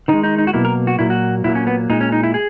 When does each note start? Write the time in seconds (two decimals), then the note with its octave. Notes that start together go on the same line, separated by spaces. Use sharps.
0.08 D#3 G#3 D#4
0.23 D#4
0.38 D#4
0.47 F#4
0.53 B2 F#3 A#3 E4
0.65 A#4
0.87 F#4
0.99 A#2 F#3 A#3 E4
1.10 F#4
1.44 A#2 F#3 A#3 E4
1.55 C#4
1.67 B3
1.90 A#2 G#3 D#4
2.01 C#4
2.12 D#4
2.23 E4
2.34 G#4